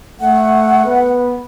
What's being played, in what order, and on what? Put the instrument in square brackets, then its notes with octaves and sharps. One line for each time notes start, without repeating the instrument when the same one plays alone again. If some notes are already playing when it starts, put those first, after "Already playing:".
[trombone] A3 [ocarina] F#5
[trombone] B3